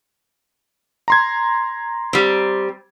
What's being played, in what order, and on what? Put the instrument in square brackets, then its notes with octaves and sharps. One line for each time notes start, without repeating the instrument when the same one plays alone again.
[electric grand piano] A#5 C6 G#6
[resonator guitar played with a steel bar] G3 C4